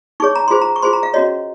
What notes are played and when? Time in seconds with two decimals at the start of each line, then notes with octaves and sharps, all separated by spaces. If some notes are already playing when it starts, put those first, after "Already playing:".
0.20 D#4 G#4 C#5 C#6
0.35 A#5
0.48 F4 G#4 C5 C6
0.62 A#5
0.76 C#6
0.82 F4 G#4 C5 C6
0.93 A#5
1.03 F5
1.14 C#4 F#4 C#5 D#5